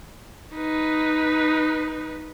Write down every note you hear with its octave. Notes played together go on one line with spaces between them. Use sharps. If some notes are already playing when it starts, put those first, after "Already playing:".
D#4 B4